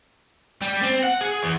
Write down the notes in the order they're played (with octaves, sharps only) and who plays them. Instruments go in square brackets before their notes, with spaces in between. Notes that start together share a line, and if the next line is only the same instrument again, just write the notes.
[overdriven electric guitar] G3
C4
F#5
G#4
E2